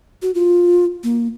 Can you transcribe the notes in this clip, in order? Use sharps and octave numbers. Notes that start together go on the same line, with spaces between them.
F#4
F4
A#3